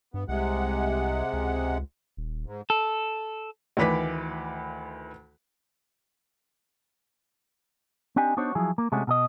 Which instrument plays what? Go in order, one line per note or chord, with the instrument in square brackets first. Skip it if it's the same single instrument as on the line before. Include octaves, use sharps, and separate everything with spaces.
[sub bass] G2 [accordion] B3
[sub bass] C2 [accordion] C3 G#3 F#5
[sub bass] C#2
D#1
[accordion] G#2
[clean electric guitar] A4
[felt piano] D2 D#3 E3 B4 D6 B6
[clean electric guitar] C4 D4 D#4 G4 G#5
B3 D4 D#4 F#4 C5 C#5
F3 F#3 E4 G#4
A#3
C3 G#3 A3 C#4 F#4
B2 A4 D#5